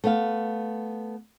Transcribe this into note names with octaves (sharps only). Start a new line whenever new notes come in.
A3 B3 F5